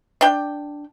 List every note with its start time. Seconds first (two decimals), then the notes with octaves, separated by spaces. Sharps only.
0.21 D4 G5